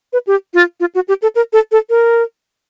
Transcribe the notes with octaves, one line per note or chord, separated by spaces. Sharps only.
B4
G4
F4
F4
F#4
G4
A4
A#4
A4
A4
A#4